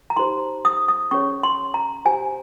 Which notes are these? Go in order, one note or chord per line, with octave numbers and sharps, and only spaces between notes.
A#5
D#4 G4 C5 C6
D#6
D#6
C#4 G#4 C#5 C#6
C6
A#5
G4 C5 G#5